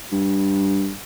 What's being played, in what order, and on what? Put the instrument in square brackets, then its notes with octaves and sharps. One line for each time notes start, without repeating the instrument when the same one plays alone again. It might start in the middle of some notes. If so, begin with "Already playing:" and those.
[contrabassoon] G2